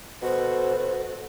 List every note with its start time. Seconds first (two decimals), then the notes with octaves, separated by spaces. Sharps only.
0.22 B2 F#4 A4 C5